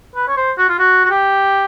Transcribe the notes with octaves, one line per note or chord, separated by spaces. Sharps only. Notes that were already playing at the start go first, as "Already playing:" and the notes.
B4
C#5
C5
F#4
F4
F#4
F#4
G4